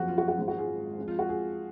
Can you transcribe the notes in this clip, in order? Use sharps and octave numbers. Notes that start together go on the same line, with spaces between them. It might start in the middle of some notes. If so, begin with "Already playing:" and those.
Already playing: F#1 F2 F3 F#4
F4
F#4
F#4
G#1 G#2 G#3 F4
F#4
F4 G#4
F2 F3 G#3
F4
F#4
F4 G#4